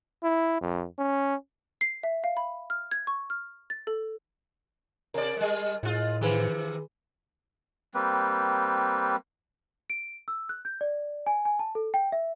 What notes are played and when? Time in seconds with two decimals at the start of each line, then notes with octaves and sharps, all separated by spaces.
0.23 E4
0.61 F2
0.99 C#4
1.81 C7
2.03 E5
2.24 F5
2.37 B5
2.70 F6
2.91 G#6
3.07 C#6
3.30 F6
3.70 A6
3.87 A4
5.14 C3 A#4 D5
5.37 G3 G#3
5.83 A2 G#3 F4
6.21 C3 D#3 E3 G#4 B4
7.94 G3 A#3 C4 B4
9.90 D7
10.28 E6
10.49 F#6
10.65 G6
10.81 D5
11.27 G#5
11.45 G#5
11.59 A5
11.75 A4
11.94 G5
12.12 E5